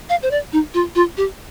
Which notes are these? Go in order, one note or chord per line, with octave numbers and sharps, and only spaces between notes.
F5
C5
D5
D#4
F4
F4
G4